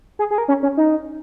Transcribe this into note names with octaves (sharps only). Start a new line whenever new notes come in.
G#4
G#4
A#4
C#4
C#4
D#4